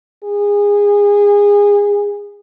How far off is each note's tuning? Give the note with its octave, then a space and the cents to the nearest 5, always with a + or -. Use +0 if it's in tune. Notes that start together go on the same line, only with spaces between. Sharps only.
G#4 -25